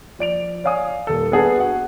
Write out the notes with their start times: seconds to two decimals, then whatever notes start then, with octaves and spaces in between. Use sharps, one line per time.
0.19 F3 D5 D7 F7
0.64 C#5 D5 F5 G#5 D#6
1.07 D#1 A4
1.32 B3 D4 G#4 F#5 A5
1.57 F#4 F#5